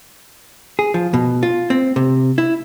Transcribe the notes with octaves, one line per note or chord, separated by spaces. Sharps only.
G#4
F3
B2
F4
C4
C3
E4